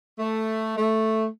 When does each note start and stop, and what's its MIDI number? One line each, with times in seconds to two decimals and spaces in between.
0.18 0.74 57
0.76 1.25 57